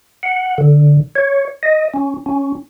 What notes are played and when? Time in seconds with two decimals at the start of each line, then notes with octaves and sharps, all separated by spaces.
0.23 F#5
0.58 D3
1.16 C#5
1.63 D#5
1.94 C#4
2.26 C#4